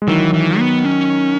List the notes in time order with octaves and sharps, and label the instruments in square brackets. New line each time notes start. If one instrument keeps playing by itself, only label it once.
[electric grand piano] G#3
[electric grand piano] D#3 F#3 [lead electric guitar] E3
[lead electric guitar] E3
B3
C#4